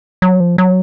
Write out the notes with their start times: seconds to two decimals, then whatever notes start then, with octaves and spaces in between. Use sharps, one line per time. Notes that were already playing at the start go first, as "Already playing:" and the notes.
0.22 F#3
0.40 F3
0.58 F#3